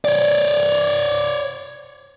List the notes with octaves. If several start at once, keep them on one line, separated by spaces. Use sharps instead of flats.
C#5 D5